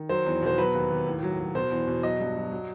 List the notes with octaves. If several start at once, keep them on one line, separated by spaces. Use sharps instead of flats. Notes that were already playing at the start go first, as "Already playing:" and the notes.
Already playing: D#3
F#3 C5
E2
B2 C5
F#3 B4
D#2
D#2
A2
F#3
F#3
B2 C5
E2
B2
F#3 D#5
G2
F#3
F#3